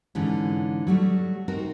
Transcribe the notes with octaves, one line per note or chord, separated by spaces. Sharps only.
G#2 D3 E3 C#4
F#3 G3 A3
C4 D#4 F#4 A#4